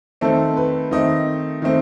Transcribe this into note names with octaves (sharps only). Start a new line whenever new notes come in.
D#3 A3 C4 A4
B4
D#3 A3 C4 D#5
D#3 A3 C4